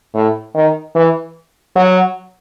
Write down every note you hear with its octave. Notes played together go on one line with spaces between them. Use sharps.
A2
D#3
E3
F#3